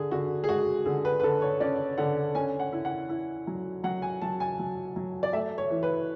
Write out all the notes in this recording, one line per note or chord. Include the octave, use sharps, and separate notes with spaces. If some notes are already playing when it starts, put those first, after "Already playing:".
Already playing: D3 G#4
D3 F#4
G#4
G#3 F#4
D3 G#4
B4
B4
D3 A4
C#5
C#4 D5
D3 F#5
C#4 G#5
F#5
E4
F#5
E4
F#3
F#3 F#5
G#5
F#3 A5
G#5
F#3
F#3
D5
A3 E5
C#5
E3
B4